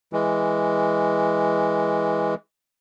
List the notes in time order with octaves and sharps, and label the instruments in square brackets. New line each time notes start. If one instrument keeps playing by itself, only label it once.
[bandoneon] E3 G#3